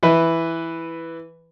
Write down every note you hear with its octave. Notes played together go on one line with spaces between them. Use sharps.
E3 B4